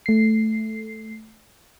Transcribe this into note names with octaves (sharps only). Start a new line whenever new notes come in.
A3 C7